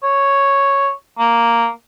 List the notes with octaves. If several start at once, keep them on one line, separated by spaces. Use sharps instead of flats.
C#5
A#3